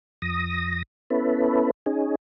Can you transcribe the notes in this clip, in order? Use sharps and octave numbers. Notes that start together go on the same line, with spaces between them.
F2 D#6 A#6
B3 C#4 E4 A4 B4
C#4 D#4 G#4